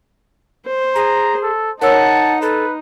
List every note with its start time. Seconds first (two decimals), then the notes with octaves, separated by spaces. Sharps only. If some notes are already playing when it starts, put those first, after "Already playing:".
0.66 C5
0.95 G#4 A#5
1.43 A4
1.81 D#4 A#4 C#5 F#5 A5 E6
2.42 A4 B4